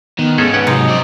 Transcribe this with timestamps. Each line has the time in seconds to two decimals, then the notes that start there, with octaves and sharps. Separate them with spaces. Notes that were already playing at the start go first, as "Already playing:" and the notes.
0.19 D#3 B3
0.38 G#2 C#3 C#4 G#4 A4
0.53 C#4 B4 F#5 G5
0.67 C3 F#3 D#4 C5 D#5
0.89 C4 D5